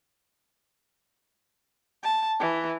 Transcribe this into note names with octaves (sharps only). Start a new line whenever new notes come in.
A5
E3